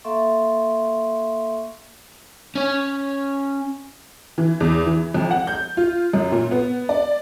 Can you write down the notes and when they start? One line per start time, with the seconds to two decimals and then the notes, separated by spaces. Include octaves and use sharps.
0.04 A#3 A4 E5 F5 C6 C#6
2.55 C#4 C#5
4.38 E3
4.60 E2
4.86 E3
5.14 F2
5.31 F#5
5.47 G6
5.77 F4
6.13 F#2
6.32 A#2
6.51 B3
6.89 D5